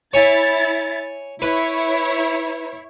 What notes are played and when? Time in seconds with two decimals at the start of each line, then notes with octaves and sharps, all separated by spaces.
0.14 E4 C#5 G#5 A6
1.42 E4 B4 C#5